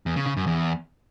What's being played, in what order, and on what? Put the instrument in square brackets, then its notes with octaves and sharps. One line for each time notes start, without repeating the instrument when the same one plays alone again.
[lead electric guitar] E2
C#3
C#3
F#2
E2